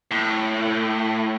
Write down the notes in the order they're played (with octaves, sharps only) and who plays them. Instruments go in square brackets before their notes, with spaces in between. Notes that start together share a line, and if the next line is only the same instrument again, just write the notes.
[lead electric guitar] A2